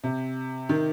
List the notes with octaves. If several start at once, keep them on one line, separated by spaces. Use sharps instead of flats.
C3
D#3